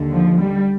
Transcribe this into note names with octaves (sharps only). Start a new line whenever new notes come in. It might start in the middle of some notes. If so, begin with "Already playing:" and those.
Already playing: D#2 D3
F3
G3